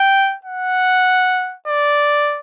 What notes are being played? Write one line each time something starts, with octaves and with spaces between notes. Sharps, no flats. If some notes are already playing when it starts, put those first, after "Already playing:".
Already playing: G5
F#5
D5